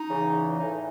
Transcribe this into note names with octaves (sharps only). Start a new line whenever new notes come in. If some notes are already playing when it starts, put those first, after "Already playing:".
Already playing: D#4
E2 C#3 E3
A2 E3 D#4